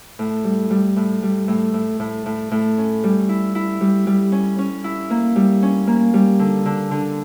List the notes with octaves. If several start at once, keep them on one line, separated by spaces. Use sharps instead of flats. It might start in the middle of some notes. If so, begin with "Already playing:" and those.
A2
G3
G3
A2
G3
A2
A2
A2
A2
A2
C#4
G3
E4
E4
G3
G3
C#4
C#4
E4
A#3
G3
C#4
A#3
G3
D3
D3
D3